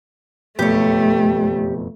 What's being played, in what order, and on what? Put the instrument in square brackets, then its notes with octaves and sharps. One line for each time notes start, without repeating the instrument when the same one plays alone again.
[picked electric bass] F#1 F2 B2 [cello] A3 [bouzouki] G4 C#5